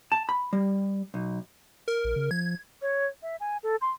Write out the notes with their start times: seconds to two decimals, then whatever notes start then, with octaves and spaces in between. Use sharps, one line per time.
0.12 A5
0.29 B5
0.53 G3
1.14 B1
1.88 A#4
2.04 A#1
2.16 C#3
2.31 F3 G#6
2.82 C#5
3.23 E5
3.40 G#5
3.63 A4
3.82 C6